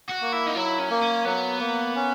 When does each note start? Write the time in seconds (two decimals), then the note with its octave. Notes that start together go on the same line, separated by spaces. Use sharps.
0.09 F#4
0.21 A#3
0.33 E4
0.47 D#4
0.55 F#3 E4
0.79 C#4
0.90 A#3
1.02 C#4
1.25 F#3 B3
1.60 A#3
1.95 C#4